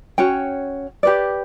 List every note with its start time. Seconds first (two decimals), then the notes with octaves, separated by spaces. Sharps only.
0.18 C#4 F#4 C#5 G5
1.03 G4 B4 D5